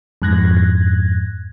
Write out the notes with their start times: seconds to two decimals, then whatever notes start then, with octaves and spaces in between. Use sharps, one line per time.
0.22 F2 G#2 F#6 G#6 A#6